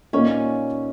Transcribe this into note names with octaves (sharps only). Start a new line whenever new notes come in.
A#2 A#3 C#4 D#4